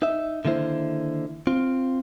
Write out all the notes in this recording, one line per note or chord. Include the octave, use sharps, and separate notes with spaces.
D#4 E5
D3 D#3 A#3 E4 C5
C4 F4